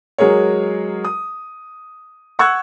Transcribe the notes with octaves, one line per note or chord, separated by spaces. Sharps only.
F#3 G#3 G#4 A#4 C#5
D#6
F#5 C#6 E6 F#6 G#6